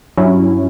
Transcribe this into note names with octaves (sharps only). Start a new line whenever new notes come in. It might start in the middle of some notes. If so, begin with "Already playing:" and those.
G2 F#3 C#4 E4